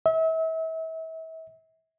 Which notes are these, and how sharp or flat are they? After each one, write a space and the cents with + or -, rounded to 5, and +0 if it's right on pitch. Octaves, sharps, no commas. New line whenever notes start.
E5 -35